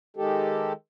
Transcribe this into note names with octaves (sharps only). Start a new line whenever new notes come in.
D#3 G#3 G4 A4